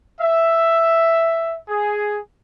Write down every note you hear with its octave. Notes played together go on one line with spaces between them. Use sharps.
E5
G#4